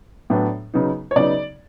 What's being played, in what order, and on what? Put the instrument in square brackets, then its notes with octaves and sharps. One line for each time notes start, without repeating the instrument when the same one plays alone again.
[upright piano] A2 F#3 B3 D4
C#3 F#3 B3 D#4
C#5
C#3 F#3 B3 D#4 D5